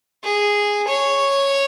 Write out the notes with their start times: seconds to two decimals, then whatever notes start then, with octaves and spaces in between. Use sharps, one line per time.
0.24 G#4
0.88 C#5